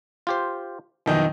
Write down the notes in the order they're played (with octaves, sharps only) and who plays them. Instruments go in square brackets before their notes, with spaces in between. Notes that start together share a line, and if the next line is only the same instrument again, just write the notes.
[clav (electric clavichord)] F4 G4 C5
[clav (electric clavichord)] B1 E3 [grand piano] F2 D#3 D#4